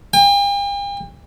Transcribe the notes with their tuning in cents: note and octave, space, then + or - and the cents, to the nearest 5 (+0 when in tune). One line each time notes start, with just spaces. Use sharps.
G5 +45